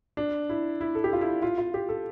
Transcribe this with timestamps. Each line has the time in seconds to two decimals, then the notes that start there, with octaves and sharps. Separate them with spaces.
0.17 D4
0.49 E4
0.81 E4
0.95 A4
1.04 G4
1.13 F4
1.21 E4
1.42 F4
1.58 F4
1.74 G4
1.89 A4